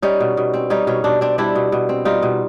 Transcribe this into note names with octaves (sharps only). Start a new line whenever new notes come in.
G3 C#4 D#4
B2
B2
C4
G3 C#4 D#4
B2 C#4
B2 D4
C4 D4
G3 D4 E4
B2
B2
C4
G3 D#4 F4
B2